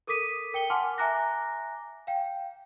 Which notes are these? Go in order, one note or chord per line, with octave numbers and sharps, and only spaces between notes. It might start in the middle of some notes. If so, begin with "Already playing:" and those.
A4 A#4 D6 D#6 B6 D#7
A#4 G5 C#7 G7
F#5 G#5 A5 C6 D6 F6
E5 G#5 A#5 D6 F#6 A#6
F5 G5